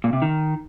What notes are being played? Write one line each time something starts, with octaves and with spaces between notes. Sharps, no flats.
A#2
C3
D#3